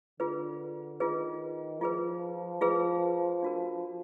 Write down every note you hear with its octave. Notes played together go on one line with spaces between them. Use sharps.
D3 F4 G#4 B4
D#3 F4 G#4 B4
F3 F4 G#4 B4
F3 F4 G#4 B4
D4 F#4 A#4